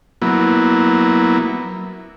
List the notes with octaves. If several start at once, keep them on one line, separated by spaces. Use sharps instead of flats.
F#3 A#3 B3 E4